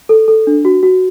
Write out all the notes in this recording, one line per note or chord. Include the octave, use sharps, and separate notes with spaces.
A4
A4
D4
F#4
F#4